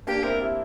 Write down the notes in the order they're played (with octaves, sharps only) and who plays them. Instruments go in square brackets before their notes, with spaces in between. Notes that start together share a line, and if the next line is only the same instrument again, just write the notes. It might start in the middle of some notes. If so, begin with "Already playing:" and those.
[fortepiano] A#3 D4 [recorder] G4
[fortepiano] C4 E4 [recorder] A#4
[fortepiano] E4 G4